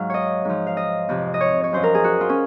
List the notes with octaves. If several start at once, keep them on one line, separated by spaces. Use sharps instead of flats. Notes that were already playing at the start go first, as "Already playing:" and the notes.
Already playing: G#2 F#3 F5
C#5 D#5
G#2 F3
F5
D#5
F2 C3 F3
D#5
C#5
C#5
F#2 F3 C5
A#4
G#4
F#4
F4
C#4